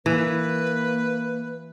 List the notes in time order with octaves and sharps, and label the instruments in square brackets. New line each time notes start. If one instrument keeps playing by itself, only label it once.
[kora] E3 [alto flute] A#3 [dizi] B4